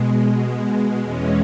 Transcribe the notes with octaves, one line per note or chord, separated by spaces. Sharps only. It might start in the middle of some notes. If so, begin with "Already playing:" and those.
Already playing: B2 G#3
E2 E3 G#3 C#4